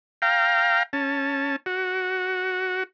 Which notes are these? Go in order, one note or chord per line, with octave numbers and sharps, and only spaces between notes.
F5 G5 A#5
C#4 A5
F#4